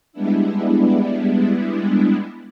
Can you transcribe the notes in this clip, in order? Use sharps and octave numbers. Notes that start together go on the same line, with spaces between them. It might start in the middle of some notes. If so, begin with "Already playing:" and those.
G3 G#3 B3 D4 E4